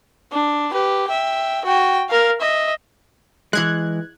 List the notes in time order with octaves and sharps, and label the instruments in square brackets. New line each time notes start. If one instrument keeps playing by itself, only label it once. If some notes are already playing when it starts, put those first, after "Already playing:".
[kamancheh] D4
G4 B4
E5 G5
F#4 G5
A#4 F5
D#5 E5
[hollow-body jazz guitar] E3 G#3 [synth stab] F#6 G#6